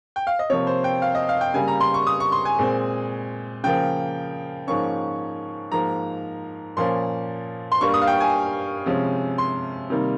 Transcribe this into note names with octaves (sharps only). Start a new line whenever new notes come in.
G5
F5
D#5
C3 F3 A#3 C#5
C5
G5
F5
D#5
F5
G5
C#3 G3 A#3 G#5
A#5
C6
C#6
D#6
C#6
C6
G#5
A#2 G#3 C4
C#3 F3 A#3 G5
G#2 F3 A#3 C#4 C#6
G#2 F3 A#3 A#5
A#2 F3 A#3 C#4 C6
C6
G2 G3 A#3 C#6
D#6
F5
G5
G#5
C3 F3 G#3 C#4
C6
C3 D#3 G3 A#3